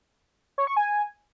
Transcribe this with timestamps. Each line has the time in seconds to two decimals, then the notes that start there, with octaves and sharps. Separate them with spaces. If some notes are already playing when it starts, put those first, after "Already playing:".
0.58 C#5
0.67 C#6
0.77 G#5